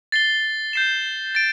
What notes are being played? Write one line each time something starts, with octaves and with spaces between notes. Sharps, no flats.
A6 C7 G7
G6 C7 E7
A6 D7